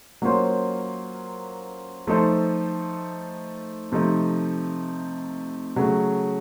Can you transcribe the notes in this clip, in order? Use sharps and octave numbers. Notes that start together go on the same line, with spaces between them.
F#3 A#3 C#4 F4 C5
F3 A3 D#4 A4 C5
C3 F3 A3 D#4
C#3 F#3 A3